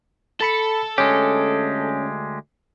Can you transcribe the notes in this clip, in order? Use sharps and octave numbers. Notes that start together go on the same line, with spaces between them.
A4 A5 B5 C#7
D2 G#3 C#4 G4